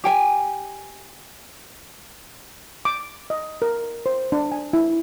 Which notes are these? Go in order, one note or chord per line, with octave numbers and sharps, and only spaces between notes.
G4 G5 G#5
D6
D#5
A#4
C5
D4
G#5
E4